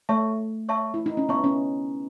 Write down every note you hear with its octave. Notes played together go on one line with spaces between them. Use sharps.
A3 C#5 E5 A5 C#6
C#5 E5 A5 C#6
E4
D#4
C#4
B3 C#5 E5 A5 C#6
C#4